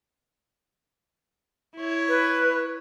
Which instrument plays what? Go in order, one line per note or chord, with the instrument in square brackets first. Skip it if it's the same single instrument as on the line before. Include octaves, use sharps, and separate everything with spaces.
[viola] E4 C#5
[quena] B4